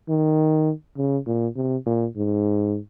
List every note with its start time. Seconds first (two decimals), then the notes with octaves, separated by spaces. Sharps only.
0.09 D#3
0.97 C#3
1.27 A#2
1.56 C3
1.86 A#2
2.16 G#2